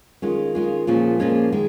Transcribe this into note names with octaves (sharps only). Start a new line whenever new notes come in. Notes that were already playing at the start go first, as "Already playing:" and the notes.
D#3 G#3 C#4 F4
D#3 G#3 C#4 F4
A#2 F3 G#3 C#4
A#2 F3 G#3 C#4
D#3 G#3